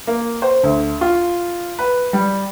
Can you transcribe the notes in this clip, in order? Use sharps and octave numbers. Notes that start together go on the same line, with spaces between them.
A#3
C5
D2
F4
B4
G3